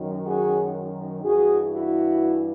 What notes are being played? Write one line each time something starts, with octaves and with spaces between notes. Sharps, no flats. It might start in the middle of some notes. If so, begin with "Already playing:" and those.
Already playing: F#2 D#3 F#3
F#4 G#4
G2 E3 F#4 G#4
E4 F#4